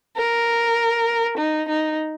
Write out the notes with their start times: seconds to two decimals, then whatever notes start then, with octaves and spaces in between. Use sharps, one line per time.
0.17 A#4
1.38 D#4
1.69 D#4